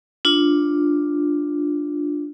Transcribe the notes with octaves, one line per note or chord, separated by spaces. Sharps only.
D4 F4